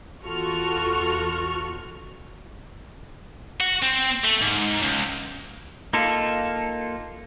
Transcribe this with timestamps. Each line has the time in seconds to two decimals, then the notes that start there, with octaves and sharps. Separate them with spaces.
0.23 E2 F4 F#4 A4 C#6 F6
3.61 F#4
3.82 C4
4.24 A3
4.41 G#2
4.82 C#2
5.93 A#3 D#4 F4 A4